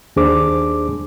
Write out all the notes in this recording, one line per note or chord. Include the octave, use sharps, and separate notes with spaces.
D#2 D4 G#4 C5 D6